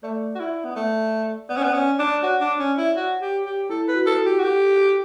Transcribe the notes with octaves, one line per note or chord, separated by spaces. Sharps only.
A3 D5
F#4
E4
B3
A3
B3 D5
C#4
B3
C#4 D5
D4 D5
F#4 C#5
D4
C#4
E4
F#4
G4
G4
E4 A4
B4
F#4
A4
F#4
G4
F#4
G4 A4